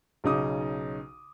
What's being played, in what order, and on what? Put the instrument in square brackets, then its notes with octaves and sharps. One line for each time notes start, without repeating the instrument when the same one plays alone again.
[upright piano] B1 C#3 D#4 D6 D#6